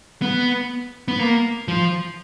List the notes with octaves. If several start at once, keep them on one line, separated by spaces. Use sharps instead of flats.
B3
B3
A#3
F3